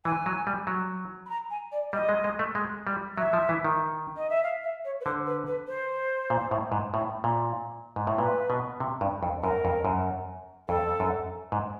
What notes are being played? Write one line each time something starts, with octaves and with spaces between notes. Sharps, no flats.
E3 G#5
F#3
G3
F#3
B5
A#5
G#5
D5
G3 D#5
G#3
G#3
A3
G#3
G3
F#3 E5
F3
E3
D#3
D#5
E5
F5
E5
C#5
B4
D3 C5
B4
B4
C5
A#2
A2
G#2
A2
A#2
G#2
A2
A#2 B4
B2
C3
G2
F2
F#2 A#4
F2
F#2
F2 A4
F#2
G#2